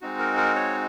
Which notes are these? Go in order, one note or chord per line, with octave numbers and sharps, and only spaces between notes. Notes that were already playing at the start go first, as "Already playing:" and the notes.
G#3 C4 D#4 F#4
A#4
A#4
C#5